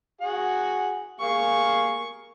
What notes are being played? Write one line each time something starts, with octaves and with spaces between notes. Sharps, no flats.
F#4 G#4 F#5
A#3 G#4 F5 C#6